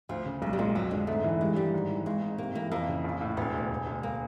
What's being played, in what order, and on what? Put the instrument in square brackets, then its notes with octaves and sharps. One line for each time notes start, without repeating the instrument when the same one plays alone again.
[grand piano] D2 [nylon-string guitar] F3
[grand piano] C#3
[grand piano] B1 [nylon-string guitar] G#3
[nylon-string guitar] G3
[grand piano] A#2 [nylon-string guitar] G#3
[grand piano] F2 [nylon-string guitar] F#3
[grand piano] D3 [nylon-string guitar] G#3
[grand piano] G#2 [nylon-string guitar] A3
[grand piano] E3
[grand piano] G2 [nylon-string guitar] G#3
[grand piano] D#3 [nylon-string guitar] G3
[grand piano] G#2
E3
[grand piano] G#1 [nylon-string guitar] G#3
[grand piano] G#2
[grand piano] C3 [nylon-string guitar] A#3
[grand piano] E3 [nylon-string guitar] A#3
[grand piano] F2 [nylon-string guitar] A#3
[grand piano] C#3
A#1
A2
[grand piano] E1 [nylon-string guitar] B3
[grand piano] D2
E1
D2
[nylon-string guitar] A#3